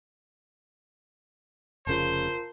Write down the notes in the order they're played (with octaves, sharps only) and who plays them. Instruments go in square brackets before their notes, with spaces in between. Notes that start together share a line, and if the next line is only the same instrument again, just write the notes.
[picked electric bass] F1 C#3 [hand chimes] F4 A#4 A5 [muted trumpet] C5